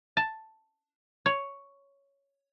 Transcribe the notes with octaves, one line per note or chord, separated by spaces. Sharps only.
A5
C#5